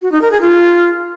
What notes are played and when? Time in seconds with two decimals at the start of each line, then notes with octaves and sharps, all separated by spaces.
0.02 F#4
0.12 D#4
0.22 A#4
0.31 G#4
0.41 F4